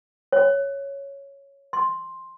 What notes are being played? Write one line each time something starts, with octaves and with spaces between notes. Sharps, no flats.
C#5
C6